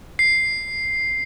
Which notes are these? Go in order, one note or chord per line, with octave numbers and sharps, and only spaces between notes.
C7